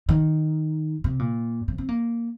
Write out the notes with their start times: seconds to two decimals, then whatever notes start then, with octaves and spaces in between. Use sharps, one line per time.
0.09 D#3
1.04 C3
1.19 A#2
1.68 C3
1.78 C4
1.89 A#3